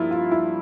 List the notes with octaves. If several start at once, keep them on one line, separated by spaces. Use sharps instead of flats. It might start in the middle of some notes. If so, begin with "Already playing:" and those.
Already playing: G2 F3 A#3 E4 F4
F4
E4